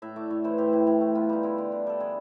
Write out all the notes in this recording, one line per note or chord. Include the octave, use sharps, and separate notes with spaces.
A2 E5
A3 D5
A2 C#5
E3 C5
A2 G4
A2
A2
A3
B3 F4
G3 D#4
D3 E4
D3
D3
G3 A4
D3 G#4